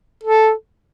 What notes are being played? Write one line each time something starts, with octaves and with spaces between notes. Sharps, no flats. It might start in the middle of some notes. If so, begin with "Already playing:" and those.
A4